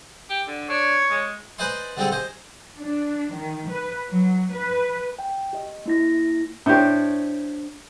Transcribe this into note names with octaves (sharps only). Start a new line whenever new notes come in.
G4
D3
D4 C#5
G#3
B4 C5 D5 D#5 G#5 C6
D3 G3 C4 G#4 A4
C5 D#5 G#5
D4
D#3
B4
F#3
B4
G5
G4 D#5
A#3 E4 A#6
A2 D4 G4 C5 C#5